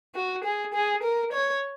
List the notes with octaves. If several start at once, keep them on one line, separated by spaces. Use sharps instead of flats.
F#4
G#4
G#4
A#4
C#5